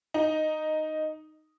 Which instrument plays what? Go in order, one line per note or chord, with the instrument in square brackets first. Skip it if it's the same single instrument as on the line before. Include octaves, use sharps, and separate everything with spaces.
[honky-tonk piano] D#4